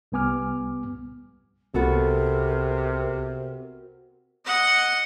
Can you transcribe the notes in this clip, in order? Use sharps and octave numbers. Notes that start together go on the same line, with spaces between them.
C2 G3 B3 G#5 D6 F6
C2 C3 B3 F#4 A4 A#4
D#5 F#5